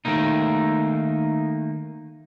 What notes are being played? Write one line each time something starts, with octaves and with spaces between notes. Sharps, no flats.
D#3 A3 A#3 D#4